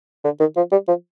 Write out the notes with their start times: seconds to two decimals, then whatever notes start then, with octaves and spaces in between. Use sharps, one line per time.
0.25 D3
0.40 D#3
0.57 F3
0.72 G3
0.88 F3